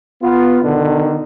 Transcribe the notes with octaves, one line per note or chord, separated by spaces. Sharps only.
B3 F4
B2 D3 D#3